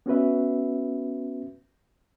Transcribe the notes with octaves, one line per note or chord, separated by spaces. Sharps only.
B3 C#4 F#4 B4 E5